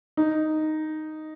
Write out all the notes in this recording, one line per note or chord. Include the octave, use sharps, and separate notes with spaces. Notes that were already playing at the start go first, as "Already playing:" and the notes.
D#4